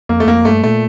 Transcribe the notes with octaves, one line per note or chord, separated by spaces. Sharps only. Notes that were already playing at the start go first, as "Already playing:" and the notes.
F2 A#3
A3
F2 A#3
G2 A3
A#2 A3